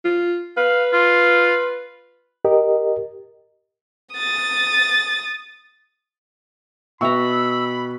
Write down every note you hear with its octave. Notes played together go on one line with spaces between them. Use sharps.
F4
B4 F5
F4
G4 A#4 D#5
D#6 A6
B2 B4 E5 G5 A#5 B5 C#6 E6